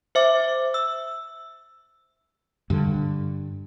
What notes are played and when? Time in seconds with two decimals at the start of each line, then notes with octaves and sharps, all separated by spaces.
0.15 C5 E5 D6
0.74 E6
2.70 G2 D3